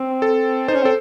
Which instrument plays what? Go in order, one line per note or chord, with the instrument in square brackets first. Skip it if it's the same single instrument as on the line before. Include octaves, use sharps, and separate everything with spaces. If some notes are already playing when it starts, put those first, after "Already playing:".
Already playing: [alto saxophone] C4
[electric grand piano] A4
[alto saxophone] D#4 [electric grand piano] C5
[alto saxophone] C#4
[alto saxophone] C4 [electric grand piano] A4